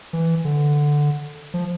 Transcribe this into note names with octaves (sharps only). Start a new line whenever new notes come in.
E3
D3
F3